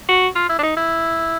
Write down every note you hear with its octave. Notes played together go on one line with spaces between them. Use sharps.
F#4
F4
E4
D4
D#4
E4